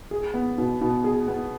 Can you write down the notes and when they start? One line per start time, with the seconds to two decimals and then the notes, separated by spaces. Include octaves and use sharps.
0.11 G#4
0.34 B3
0.58 B2
0.81 B2
1.04 G#4
1.28 B3